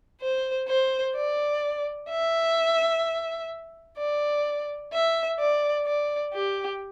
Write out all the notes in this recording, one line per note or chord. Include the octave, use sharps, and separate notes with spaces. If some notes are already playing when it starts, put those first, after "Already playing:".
C5
C5
D5
E5
D5
E5
D5
D5
G4